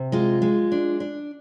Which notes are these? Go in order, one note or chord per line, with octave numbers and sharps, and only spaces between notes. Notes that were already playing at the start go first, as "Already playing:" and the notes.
Already playing: C3
G#3 F4
G#3
D4
D4